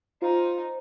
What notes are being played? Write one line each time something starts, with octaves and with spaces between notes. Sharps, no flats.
D#4 F4 C5